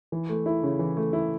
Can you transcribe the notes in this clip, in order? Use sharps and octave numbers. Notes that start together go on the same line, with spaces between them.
E3
A3
E4
C#3
E3
A3
E4